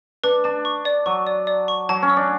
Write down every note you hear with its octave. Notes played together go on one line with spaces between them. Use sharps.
D4 B4
D4 A5
C#6
D5
F#3 C#6
D5
D5
C#6
F#3 A5
C#4
E6
D4